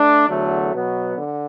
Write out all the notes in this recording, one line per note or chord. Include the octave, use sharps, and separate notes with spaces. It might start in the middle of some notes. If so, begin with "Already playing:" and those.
Already playing: A3 D4
E2 D3 F#3 A3
B2 F#3 B3
D3